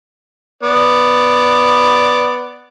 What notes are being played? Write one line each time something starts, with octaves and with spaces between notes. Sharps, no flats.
B3 D5